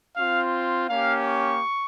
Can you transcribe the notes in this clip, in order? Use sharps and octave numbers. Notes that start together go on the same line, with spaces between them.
C4 F4 F5
A#3 C#4 G4 F5
C#6